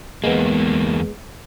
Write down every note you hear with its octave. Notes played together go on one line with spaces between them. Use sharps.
E2 G#2 G#3 A#3 B3